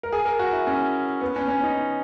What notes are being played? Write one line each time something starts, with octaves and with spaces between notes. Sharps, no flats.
A#4
G#4
A#4
F#4
E4
C#4
B3
C#4
C#4
D#4